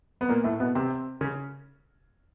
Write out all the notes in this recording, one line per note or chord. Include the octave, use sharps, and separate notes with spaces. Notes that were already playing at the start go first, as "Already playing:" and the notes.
B3
A#2 A#3
A2 A3
B2 B3
C3 C4
C#3 C#4